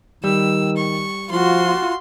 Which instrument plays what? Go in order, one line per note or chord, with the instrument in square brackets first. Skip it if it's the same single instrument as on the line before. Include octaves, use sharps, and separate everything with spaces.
[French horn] D#3 [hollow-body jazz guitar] G3 [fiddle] E6
[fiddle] C#6
[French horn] F3 [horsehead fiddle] F4 F#4 [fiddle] C6